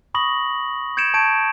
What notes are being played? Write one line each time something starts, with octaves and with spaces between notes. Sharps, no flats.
B5 C#6 D#6 A#6 F#7
G6 G#6 C#7 D7 E7
A5 C#6 G6 G#6 D7